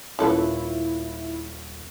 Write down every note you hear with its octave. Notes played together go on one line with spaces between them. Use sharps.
D#1 C#4 E4 F4 A4 B4 C#5